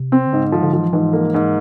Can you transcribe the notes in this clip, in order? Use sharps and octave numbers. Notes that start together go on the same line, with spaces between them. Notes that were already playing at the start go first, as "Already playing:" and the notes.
Already playing: C3
C4
D3
G#2 C#3
D3 F3
D3
E3 F3
G#2 E3
A#3
G#2